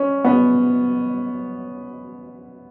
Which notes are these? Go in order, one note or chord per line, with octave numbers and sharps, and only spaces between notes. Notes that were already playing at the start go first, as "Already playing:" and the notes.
Already playing: C#4
B3